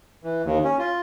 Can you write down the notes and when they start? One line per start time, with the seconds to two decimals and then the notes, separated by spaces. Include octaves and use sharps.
0.23 E3
0.44 D#2
0.64 C#4
0.78 F4